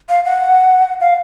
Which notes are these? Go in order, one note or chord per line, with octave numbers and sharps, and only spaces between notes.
F5
F#5
F5